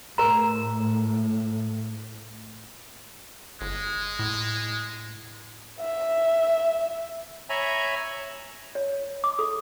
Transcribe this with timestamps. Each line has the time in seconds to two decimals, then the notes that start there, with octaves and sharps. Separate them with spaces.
0.18 A2 A#4 A#5
3.61 G1 G#3
4.19 A2
5.81 E5
7.50 C#5 E5 G#5 A#5 B5
8.75 C#5
9.24 D6
9.39 A4